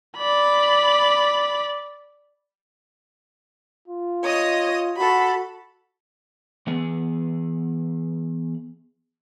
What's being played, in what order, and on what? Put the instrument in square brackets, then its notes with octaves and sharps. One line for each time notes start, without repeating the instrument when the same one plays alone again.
[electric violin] D5 B5
[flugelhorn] F4
[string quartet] C#5 D#5 D#6
[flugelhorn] F#4 [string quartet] A4 B5
[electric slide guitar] E3 B3 G#4